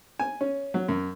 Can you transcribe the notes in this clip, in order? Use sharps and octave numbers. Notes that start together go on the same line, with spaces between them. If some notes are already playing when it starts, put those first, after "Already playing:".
G#5
C#4
F#3
F#2